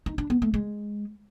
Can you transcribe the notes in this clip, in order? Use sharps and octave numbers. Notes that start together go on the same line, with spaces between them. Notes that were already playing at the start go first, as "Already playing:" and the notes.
D#4
D4
B3
A3
G#3